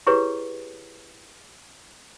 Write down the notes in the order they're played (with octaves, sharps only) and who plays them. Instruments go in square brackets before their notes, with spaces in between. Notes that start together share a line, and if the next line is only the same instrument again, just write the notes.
[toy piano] E4 G4 G#4 B4 C#5